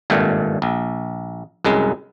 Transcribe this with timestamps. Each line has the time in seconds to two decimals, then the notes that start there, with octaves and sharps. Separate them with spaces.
0.10 G#1 G2 A#2 A3 G5
0.62 A#1
1.65 C2 F#2 G#3